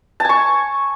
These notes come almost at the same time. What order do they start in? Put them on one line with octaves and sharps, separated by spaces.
A5 G#5 C#6